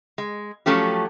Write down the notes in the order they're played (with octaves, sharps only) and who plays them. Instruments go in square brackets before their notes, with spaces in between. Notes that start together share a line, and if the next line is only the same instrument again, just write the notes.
[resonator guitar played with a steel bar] G#3
F3 F#3 A3 C#4 G4